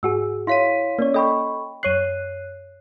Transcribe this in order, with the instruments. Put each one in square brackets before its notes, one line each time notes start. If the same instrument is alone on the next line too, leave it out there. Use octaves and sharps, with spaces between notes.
[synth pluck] G#2 F#4 G#4 [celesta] E6
[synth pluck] E4 B6 D#7 [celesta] C#5 F5 C6
[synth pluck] A#3 C#4 C#5 [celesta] D5
[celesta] A4 B5 C#6 [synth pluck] D#5 G5
[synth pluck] F#2 C#5 F#6 [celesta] C7 D#7